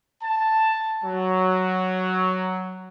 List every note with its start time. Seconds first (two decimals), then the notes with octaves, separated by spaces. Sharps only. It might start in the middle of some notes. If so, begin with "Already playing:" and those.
0.22 A5
1.04 F#3